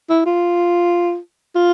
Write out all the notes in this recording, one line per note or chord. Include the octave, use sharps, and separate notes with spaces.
E4
F4
F4